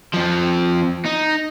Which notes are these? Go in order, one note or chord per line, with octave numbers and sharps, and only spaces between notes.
F2 F3
D#4